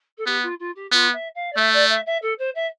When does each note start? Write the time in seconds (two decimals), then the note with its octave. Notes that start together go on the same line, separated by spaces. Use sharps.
0.17 A4
0.26 B3 G4
0.42 F4
0.59 F4
0.75 G4
0.92 B3 F4
1.13 E5
1.35 F5
1.52 D5
1.57 A3 E5
1.73 D5
1.89 E5
2.06 E5
2.22 A4
2.38 C5
2.55 E5